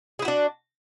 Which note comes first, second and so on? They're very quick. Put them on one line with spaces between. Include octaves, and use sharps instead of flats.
G#4 E4 F#4 D4